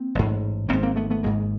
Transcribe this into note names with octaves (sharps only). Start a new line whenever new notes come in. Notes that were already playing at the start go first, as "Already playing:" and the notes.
Already playing: A#3 C4
A1 G#2
G#1 G#2 A#3 C4
A#3 C4
A3 B3
A3 B3
G#1 G#2 G#3 A#3